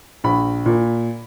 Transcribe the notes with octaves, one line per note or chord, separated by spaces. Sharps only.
A#1 B5
A#2